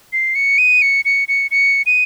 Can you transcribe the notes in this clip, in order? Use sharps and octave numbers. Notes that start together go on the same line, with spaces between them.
C7
C#7
D#7
C#7
C#7
C#7
C#7
D#7